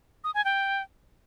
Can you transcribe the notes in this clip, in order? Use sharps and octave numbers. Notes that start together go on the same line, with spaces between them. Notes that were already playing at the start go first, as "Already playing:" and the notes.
D#6
G#5
G5